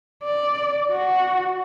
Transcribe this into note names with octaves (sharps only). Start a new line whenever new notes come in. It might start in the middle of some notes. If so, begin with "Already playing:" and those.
D5
F#4